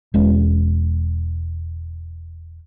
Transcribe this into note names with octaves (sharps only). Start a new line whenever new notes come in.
E1 G#3 C#4